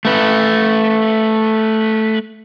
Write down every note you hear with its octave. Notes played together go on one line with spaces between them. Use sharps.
A3 B4